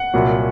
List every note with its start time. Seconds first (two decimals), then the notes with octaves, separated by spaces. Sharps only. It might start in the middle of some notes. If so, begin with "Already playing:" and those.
Already playing: F#5
0.14 C2 A#2 F#3